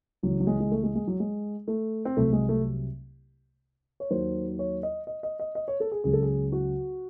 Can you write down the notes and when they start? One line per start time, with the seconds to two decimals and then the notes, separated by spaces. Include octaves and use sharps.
0.23 C#2 C#3 E3 F#3
0.40 F#3
0.47 G#3
0.60 G#3
0.71 A3
0.84 G#3
0.95 G#3
1.07 F#3
1.20 G#3
1.68 A3
2.05 C4
2.16 C2 C3 F#3 A3
2.33 G#3
2.49 A3
4.00 C#5
4.10 D#2 D#3 F#3 C5
4.59 C#5
4.83 D#5
5.07 D#5
5.23 D#5
5.40 D#5
5.55 D#5
5.68 C#5
5.80 A4
5.92 G#4
6.04 C#2 C#3 F#3 G#4
6.13 A4
6.23 G#4
6.52 F#4